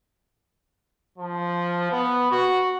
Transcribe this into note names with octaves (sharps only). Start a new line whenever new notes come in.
F3
B3
F#4